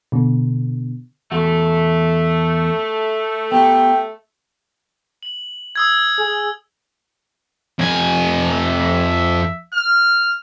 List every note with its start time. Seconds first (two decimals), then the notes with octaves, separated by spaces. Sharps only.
0.12 B2 D3
1.32 E2 A3 F#4
3.52 B3 G4 G5
5.23 F#7
5.76 D#6 E6 G#6
6.19 G#4
7.79 F2 G#5
8.53 E5
9.74 F6